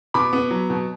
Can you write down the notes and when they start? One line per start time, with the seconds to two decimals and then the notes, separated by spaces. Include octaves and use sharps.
0.14 B2 B5 D6
0.33 B3
0.51 F#3
0.70 B2